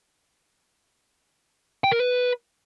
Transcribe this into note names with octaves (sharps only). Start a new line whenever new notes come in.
G5
A#4
B4